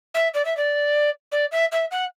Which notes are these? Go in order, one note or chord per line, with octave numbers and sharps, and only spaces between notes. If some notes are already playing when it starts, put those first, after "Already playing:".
E5
D5
E5
D5
D5
E5
E5
F#5